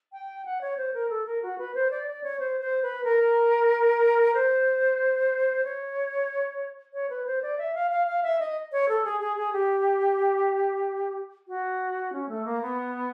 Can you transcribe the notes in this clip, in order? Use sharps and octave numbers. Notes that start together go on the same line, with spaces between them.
G5
F#5
C#5
C5
A#4
A4
A#4
F#4
B4
C5
D5
D5
C#5
C5
C5
B4
A#4
C5
C#5
C#5
B4
C5
D5
E5
F5
F5
F5
E5
D#5
C#5
A4
G#4
G#4
G#4
G4
F#4
C#4
A3
A#3
B3